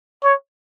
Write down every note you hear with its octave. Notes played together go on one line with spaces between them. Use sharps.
C#5